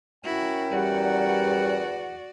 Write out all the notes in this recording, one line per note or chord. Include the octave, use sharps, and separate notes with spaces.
C#4 E4 F#4 A#4 G5
E2 G3 F#4 D5 F#5